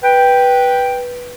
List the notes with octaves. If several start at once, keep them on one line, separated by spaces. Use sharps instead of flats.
B4 G5